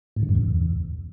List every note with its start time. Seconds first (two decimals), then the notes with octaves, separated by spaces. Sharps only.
0.16 A2
0.23 C#3
0.29 F#2
0.35 E2